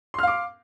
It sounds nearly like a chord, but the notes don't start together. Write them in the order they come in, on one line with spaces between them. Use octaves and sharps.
C6 F6 F5 D6